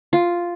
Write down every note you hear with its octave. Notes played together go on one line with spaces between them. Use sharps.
F4